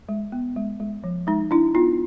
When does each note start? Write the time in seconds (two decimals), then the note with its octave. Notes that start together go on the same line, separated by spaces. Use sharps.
0.09 G#3
0.32 B3
0.56 G#3
0.80 G#3
1.04 F3
1.27 G#3 D#4
1.51 D4 E4
1.75 B3 D#4 F4